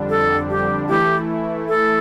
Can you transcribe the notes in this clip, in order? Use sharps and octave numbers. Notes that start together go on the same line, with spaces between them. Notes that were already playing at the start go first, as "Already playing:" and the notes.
Already playing: F2 D3 G3 D4
A4
G4
E3 A3 E4 G4
A4